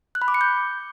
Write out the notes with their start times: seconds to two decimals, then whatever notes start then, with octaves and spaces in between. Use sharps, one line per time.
0.15 F#6
0.22 B5
0.28 D6
0.34 C#7
0.41 G6